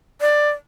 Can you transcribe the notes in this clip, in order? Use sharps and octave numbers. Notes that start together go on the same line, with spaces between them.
D5